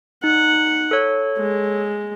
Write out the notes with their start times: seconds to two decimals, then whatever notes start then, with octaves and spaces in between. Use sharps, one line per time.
0.24 D#4 F#5
0.91 A4 C#5
1.38 G#3